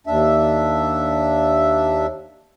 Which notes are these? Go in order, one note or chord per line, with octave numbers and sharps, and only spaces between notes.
D#2 D4 E5